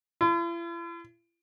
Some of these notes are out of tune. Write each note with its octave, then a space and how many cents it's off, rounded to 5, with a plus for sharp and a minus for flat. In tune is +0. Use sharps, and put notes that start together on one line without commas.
E4 +45